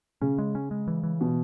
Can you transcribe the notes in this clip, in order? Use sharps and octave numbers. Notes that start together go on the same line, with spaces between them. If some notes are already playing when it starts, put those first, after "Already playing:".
C#3 C#4
G#3
C#4
G#3
E3
E3
B2